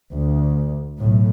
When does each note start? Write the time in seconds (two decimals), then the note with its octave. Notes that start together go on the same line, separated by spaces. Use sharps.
0.12 D2
1.00 B1 A2